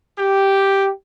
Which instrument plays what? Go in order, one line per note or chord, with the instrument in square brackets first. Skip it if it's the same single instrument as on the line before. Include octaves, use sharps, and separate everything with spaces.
[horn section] G4